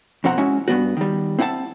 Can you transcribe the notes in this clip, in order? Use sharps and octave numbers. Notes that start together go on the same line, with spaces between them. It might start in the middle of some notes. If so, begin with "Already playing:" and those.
F2 B2 C4 F#5 A#5
G#3 C#4 E4 F#4
G2 D#3 B3 F#4
D#3 G3
C4 E4 F#5 G#5 A5